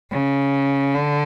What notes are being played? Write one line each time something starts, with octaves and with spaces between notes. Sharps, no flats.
C#3
D3